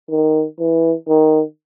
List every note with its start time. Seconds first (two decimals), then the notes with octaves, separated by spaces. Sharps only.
0.10 D#3
0.59 E3
1.08 D#3